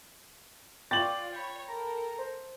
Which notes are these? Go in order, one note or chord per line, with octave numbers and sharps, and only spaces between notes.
F4 D5 G5 C#6 D6 A6 F#7
C#5 G5 B5
A4 A#4 A#5
C5